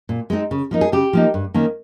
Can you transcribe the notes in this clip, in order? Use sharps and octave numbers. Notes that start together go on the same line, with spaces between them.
A#2
G#3 C4 D#4
C#3
F3 A#3 D#4
G#4
C#3 G4
F3 A#3 D#4
G2
D#3 A#3 C#4